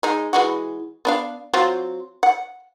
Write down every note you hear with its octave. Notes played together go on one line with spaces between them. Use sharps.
G#3 D#4
E3 G#3 F#4
B3 D4 F5
F#3 C4 F4
F#5